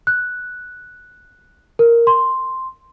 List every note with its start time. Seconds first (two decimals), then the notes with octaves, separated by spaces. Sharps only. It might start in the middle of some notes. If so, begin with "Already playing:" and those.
0.07 F#6
1.79 A#4
2.07 C6